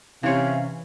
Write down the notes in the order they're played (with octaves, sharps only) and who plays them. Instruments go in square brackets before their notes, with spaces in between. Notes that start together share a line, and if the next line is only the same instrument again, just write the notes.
[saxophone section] C3 [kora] E3 C#5 [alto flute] C#4 [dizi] F5